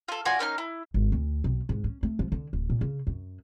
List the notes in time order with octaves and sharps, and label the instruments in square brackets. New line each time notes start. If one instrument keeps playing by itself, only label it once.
[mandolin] F4 A4
F4 F#4 D5 G#5
A#3 C#4 D#4 F6
E4
[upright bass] G#1
D2
B1
G#2
C#4
A3
F3
D3
D1
A#2
C#3
F#2